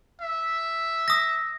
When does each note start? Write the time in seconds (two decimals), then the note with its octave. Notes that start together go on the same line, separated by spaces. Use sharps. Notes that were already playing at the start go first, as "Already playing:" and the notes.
0.21 E5
1.08 D#6 A#6